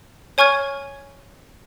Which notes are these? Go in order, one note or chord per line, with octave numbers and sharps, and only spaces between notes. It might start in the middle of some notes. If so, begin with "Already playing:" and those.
C#5 G#5 C#6 F6 G#6